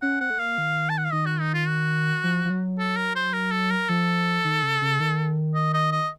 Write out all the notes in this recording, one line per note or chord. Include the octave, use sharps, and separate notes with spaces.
C#4 F#5
C4 F#5
A3
A#3 F5
D#3
A5
F#5
F5
D#3 D#5
F#4
D#4
F4
F#4
F3
F3
F#3
A4
A#4
C5
A#4
A4
A#4
F3 A4
D#3
C#3
C#3
D#3
D#5
D#5
D#5